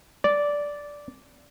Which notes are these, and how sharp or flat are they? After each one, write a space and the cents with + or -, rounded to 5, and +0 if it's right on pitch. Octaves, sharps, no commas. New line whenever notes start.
D5 -10